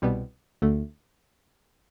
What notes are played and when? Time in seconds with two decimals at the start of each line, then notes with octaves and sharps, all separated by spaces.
0.02 C2 B2 G3 B3
0.62 D2 D3 A3